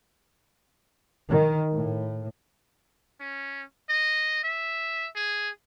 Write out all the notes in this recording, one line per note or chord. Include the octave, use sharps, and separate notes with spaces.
D#3
A2
C#4
D#5
E5
G#4